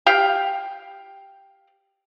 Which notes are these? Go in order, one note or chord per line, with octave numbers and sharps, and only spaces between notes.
G4 F5 G5